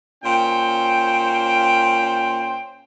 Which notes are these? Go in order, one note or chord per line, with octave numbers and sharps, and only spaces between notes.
A#2 C#4 C5 G5